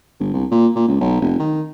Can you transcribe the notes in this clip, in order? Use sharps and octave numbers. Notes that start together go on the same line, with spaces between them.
G1
C2
A#2
A#2
C#2
B1
F1
D#3